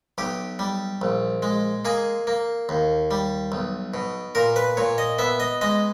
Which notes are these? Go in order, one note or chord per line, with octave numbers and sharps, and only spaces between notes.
B1 G4
G3
A#1
G#3
A#3 G#4
A#3
D#2
G3
B1
B2
A#2 A#4
B4
A#2 C#5
D#5
B3 E5
D#5
G#3 D#5